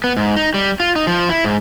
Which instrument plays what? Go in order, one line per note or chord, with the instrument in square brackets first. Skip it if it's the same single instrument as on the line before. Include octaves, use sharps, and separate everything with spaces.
[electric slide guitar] B3
G#2
D#4
G3
F4
D#4
F3
E4
G#2